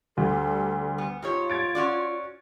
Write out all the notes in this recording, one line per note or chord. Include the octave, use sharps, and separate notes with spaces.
D2 G3 A4
B3
G#2 F4 G4 C#5
G#6 A6 D7
C#4 F#4 D5